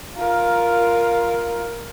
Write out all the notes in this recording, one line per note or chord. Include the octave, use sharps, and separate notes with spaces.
F4 A#4